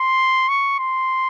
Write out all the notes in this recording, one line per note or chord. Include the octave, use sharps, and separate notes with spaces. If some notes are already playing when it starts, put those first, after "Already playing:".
Already playing: C6
C#6
C6